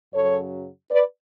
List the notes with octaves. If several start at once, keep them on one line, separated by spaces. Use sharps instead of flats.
F#2 C#3 F#3 A4 C#5
B4 D5